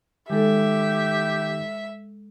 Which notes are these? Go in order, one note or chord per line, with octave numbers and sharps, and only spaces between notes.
D#3 G#3 D#4 G4 A4 E5